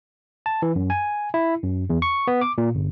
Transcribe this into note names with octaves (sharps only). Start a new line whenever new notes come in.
A5
E3
F#2
G#5
E4
F#2
E2
C#6
B3
D6
A#2
G1